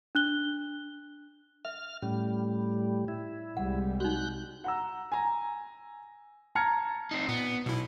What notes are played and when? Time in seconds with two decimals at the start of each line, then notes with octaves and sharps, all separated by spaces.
0.15 D4 F#6 G7
1.65 E5 F6
2.02 A2 G3 C#4
3.08 E4
3.57 C2 G3 G#3 F#5
4.00 D#4 F#4 F#6 G6
4.64 F#5 A#5 E6
5.12 G#5 A#5
6.55 A5 A#5 F6 G#6 C#7
7.11 C4 D#4
7.29 A#2 B3
7.66 B1 B2 E4